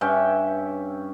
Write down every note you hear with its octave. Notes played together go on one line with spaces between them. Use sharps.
G2 C#4 E5 G5